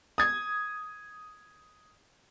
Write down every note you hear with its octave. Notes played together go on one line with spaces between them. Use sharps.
D#6 G#6